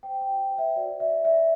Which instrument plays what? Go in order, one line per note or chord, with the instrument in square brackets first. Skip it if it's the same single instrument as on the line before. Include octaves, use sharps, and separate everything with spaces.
[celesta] C5 G5
G5
F#4
C5
E5
F#4 D5
D5 E5
D5 E5